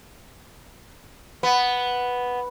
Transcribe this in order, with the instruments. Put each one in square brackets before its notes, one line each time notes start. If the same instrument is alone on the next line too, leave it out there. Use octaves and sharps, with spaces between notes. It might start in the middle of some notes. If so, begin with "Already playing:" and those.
[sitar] B3